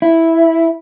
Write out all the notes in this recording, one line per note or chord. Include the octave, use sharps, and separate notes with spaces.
E4